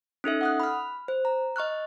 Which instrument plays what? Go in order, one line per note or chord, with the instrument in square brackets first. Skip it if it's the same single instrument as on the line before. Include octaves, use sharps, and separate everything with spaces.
[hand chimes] C#4 D#4 A4 E5
F#5 D#6 F#6
B5 F6
C5
A#5
D#5 C#6 F6 F#6